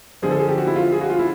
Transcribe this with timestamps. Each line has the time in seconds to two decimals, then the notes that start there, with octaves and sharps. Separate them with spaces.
0.22 D3 F3 G#3 G#4
0.31 A4
0.39 G#4
0.49 G4
0.58 F#4
0.67 E4
0.76 F4
0.92 G#4
1.01 F#4
1.10 F4
1.19 E4